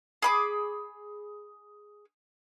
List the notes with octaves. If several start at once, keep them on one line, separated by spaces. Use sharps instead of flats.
G#4 B5 D6